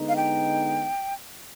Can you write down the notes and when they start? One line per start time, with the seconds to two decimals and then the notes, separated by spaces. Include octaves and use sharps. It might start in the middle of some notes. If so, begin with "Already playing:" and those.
Already playing: D3 G#3 B3 D#4
0.08 F5
0.16 G5